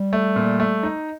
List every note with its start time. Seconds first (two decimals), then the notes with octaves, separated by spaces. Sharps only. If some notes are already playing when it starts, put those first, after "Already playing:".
Already playing: G3
0.13 A3
0.36 A#2
0.60 A3
0.83 D#4